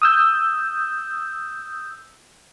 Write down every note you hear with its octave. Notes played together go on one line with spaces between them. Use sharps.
D#6 E6 G6